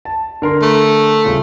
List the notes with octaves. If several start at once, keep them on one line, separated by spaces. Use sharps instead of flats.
A5
D3 A#4 C6
A3
D#1 C#3 F4